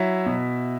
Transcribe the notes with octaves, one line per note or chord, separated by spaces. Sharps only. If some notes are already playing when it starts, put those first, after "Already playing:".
Already playing: F#3 E4 E5
B2